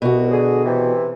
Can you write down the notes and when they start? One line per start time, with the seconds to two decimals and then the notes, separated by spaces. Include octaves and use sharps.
0.02 C2 B2 F#4
0.31 D3 G#4
0.65 C3 E3